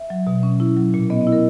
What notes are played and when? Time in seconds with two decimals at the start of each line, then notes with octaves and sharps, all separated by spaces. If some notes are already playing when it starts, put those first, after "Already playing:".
Already playing: E5
0.10 F#3
0.27 B2
0.43 C#4
0.60 E4
0.77 F#3
0.94 A#2
1.10 B3 D#5
1.21 D#5
1.27 E4
1.32 A#4